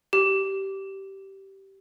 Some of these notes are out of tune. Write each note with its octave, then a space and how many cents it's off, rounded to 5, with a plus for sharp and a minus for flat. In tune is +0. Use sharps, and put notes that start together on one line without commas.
G4 -15